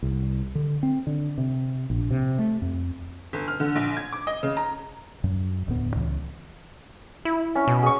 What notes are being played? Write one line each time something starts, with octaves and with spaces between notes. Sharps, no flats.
C2
D3
C4
D3
C3
A#1
C3
A3
F2
G1
F6
D3
A#1
G#6
D6
D#5
C#3
A#5
F#2
E1 D2 A2 B3
C#2 C#3 E3
E4
C#4
B2
G#4 C#6